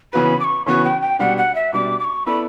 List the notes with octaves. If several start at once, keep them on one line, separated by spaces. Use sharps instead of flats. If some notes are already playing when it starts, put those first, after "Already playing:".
C#3 E3 B3 F#4 B4 B5
D6
C#6
C#3 E3 B3 F#4 B4 C#6
G5
G5
B2 G3 D4 F#5
F#5
E5
B2 G3 D4 D6
D6
C#6
B3 E4 A4 D5 B5